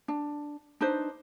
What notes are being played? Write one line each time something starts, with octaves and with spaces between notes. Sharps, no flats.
D4
D4 D#4 B4 C5